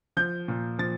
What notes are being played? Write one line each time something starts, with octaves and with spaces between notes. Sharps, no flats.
F3 G6
A#2
F3 A6